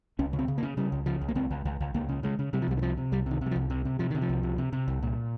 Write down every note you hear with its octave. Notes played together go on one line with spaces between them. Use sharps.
C#2 C#4
C#3
C4
C#3
A#3
C#3
C#3 G3
C#2
C#3 F3
C#2
A#3
C#2 C4
C#2
C#2
C#2
C#2 A#3
C#3
C#3 G#3
C#3
C3 G3
F3
C2 G3
D#3
C3 F3
C3
C2 G3
C3 D#3
C3 G3
F3
C2
C3
C3
C3 F3
C3 D#3
F3
C2
C3
C3
C3
C2
A#2